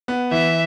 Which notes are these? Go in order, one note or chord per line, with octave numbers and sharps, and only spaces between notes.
B3
E3 E5